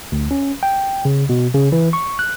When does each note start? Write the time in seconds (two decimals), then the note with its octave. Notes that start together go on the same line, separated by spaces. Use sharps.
0.12 D2
0.31 C#4
0.63 G5
1.05 C#3
1.29 B2
1.54 C#3
1.72 E3
1.93 C#6
2.19 F#6